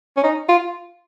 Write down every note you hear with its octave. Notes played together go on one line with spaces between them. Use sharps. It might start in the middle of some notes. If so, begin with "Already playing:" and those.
C#4
D#4
F4